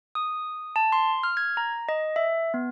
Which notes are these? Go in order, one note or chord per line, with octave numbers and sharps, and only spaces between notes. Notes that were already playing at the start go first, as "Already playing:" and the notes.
D#6
A5
C6
F6
G#6
A#5
D#5
E5
B3